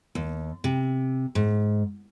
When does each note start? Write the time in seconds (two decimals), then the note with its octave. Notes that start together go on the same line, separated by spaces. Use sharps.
0.15 D#2
0.64 C3
1.35 G#2